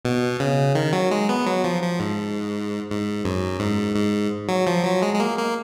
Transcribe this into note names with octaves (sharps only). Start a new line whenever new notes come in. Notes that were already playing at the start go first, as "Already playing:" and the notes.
B2
C#3
D#3
F#3
G#3
B3
F#3
F3
F3
G#2
G#2
F#2
G#2
G#2
F#3
F3
F#3
G#3
G#3
A#3
A#3